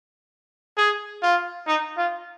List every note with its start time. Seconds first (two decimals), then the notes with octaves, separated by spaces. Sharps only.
0.77 G#4
1.22 F4
1.67 D#4
1.97 F4